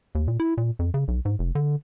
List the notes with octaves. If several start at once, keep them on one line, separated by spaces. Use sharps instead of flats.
D#2
A#2
E4
A#2
F2
C#3
B1
G#2
F1
D3